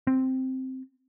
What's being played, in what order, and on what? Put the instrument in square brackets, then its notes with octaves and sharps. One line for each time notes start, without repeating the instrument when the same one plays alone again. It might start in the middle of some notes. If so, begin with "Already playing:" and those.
[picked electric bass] C4